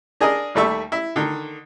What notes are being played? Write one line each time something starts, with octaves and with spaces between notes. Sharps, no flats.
D4 G#4 A#4 D#5
D#2 G3 A3 E5 C#6
E4
D3 D#3